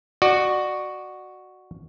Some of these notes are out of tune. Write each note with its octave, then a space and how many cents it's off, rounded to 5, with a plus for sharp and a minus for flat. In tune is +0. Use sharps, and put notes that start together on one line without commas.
F#4 +0 D5 +30